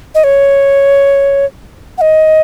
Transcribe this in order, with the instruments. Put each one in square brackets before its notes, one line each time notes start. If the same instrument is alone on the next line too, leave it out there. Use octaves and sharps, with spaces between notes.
[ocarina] D#5
C#5
F#5
D#5